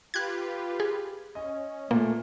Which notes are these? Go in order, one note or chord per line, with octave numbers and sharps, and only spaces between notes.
F4 G4 B4 F#6 G#6
G#4
C#4 D#5
A#2 A3 A#3